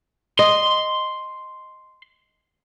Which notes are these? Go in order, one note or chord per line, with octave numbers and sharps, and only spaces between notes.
D#5 C6